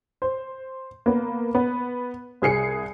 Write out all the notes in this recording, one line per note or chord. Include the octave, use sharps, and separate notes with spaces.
C5
A#3 B3
B3
C2 G#4 C7 C#7